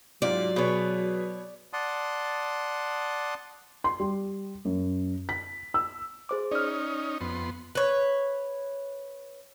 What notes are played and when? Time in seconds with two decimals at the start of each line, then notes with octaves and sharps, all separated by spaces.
0.22 G#2 F#3 F4 G4 D5
0.56 B2 G#4 B4 C#5
1.73 D5 F#5 A5 C6 D#6
3.84 C6
4.00 G3
4.65 F#2
5.29 B6
5.74 E6
6.29 G#4 C5 D6
6.51 C#4 D#4 D5 F6
7.21 F2 B3 C6
7.75 B4 C#5